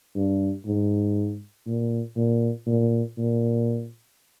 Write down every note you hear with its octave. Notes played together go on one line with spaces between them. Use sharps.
G2
G#2
A#2
A#2
A#2
A#2